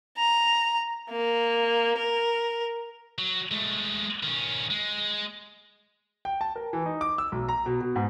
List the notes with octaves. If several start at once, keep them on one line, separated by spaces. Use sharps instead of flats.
A#5
A#3
A#4
F#3
G#3 A3
D#3 C#4
G#3
G5
A5
A#4
E3
D#4
D6
E6
B1
A#5
B2
B2
G#2